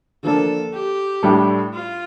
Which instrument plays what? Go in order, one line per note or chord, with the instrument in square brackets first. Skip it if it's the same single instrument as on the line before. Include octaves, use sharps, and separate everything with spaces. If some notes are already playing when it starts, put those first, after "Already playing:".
[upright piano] D3 F3 A#3 D4 [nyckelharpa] A4
[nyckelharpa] G4
[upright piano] A2 G3 D4 A4
[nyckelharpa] F4